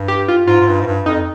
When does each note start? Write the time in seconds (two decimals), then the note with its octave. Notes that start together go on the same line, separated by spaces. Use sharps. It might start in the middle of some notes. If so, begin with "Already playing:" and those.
Already playing: G2
0.08 G4
0.28 F4
0.47 G#2 F4
0.60 G#2
0.67 G2
0.81 G#2
0.87 G2
1.06 F2 D#4